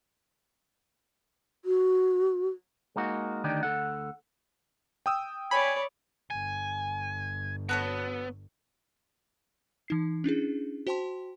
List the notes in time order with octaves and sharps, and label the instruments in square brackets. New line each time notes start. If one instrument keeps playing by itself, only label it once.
[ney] F#4
[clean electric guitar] G#3 A#3 D#4 F#4
D2 D#3 D4 D#4 G4
D2 A4 F#5
[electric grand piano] G5 D#6 E6
[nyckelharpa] C#5 D5 [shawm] G#5 [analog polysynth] B5
[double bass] G1 [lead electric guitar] G#5
[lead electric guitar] B3 [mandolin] F#4 A4 C#5
[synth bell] E3 D#4 C7
C#4 D4 E4 G#4
F#4 C5 G5 A5 C6